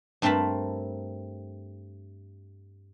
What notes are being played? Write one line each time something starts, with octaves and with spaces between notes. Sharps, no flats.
G2 A3 C4 A#4 A5 B5